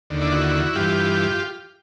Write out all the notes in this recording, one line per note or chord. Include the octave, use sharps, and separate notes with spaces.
D#2 D3
D4 E4
E4 F#4
G2 E3 F4 G4